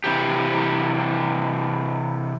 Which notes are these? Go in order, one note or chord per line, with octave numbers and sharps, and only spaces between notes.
C3 E3 G4